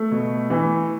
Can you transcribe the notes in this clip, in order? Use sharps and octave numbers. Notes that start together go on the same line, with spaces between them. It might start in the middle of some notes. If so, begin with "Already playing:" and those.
Already playing: A3
B2
E3